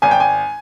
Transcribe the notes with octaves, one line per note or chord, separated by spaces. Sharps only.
G#1 G#5
G5
G#5